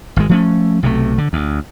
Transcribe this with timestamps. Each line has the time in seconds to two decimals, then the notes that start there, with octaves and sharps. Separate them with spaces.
0.16 G#1 G#3
0.29 F3 A3 C#4
0.83 B1 C3 E3 A3
1.18 D3
1.33 D2